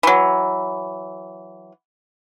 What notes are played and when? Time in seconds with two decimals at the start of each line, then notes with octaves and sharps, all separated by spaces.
0.03 E3 F#3